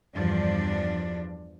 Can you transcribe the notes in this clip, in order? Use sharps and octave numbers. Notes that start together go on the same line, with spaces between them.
E2 G2 F3 D4